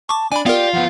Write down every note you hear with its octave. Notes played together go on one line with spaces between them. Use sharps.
A5 C#6 D6
D4 D5 G#5 B5
B3 F4 G4 A#4 D5
F3 B3 F#5